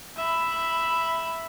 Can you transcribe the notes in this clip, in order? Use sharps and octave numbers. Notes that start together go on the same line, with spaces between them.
E5 B5